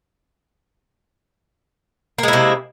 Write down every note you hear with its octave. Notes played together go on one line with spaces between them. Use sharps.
C3 G#3 A#3 E4